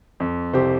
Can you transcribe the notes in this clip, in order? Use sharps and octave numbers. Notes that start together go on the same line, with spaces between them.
F2
C2 G4 C5